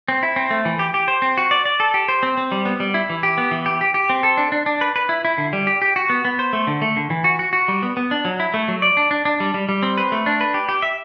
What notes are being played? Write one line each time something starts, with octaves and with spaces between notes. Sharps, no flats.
C4
E4
C4
A3
E3
G4
G4
C5
C4
F#4
D5
D5
A4
G4
C5
C4
C4
G3
B3
G3
E4
E3
G4
B3
E3
G4
G4
G4
C4
A4
D4
D4
D4
B4
B4
E4
E4
D3
G3
G4
G4
F#4
B3
B3
C5
A3
D3
A3
D3
E3
F#4
F#4
F#4
G3
B3
B3
D4
F#3
E4
A3
F#3
D5
D4
D4
D4
G3
G3
G3
C4
B4
A3
D4
B4
G4
G4
E5